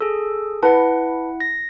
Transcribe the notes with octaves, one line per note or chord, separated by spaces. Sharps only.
G#4 A4
E4 B4 F#5 A5
A#6